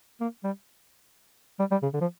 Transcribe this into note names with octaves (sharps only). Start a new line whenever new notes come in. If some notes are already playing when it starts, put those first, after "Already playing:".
A#3
G3
G3
G3
C#3
D3
F3